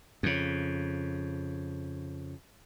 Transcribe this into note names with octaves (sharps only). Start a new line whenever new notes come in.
F2 C#3